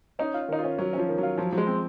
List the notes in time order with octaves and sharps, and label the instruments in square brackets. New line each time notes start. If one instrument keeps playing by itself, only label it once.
[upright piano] C#4 [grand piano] D#4
[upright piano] F4
[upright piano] D#3 [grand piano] D#4
[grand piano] F4
[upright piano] C#4
[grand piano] F#3 [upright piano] C#4
[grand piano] F3 [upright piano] C#4
[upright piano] D#3
[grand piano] F#3 [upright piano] F4
[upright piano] F3 [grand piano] F#3
[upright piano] F3 [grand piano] F#3
[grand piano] G#3
[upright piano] C4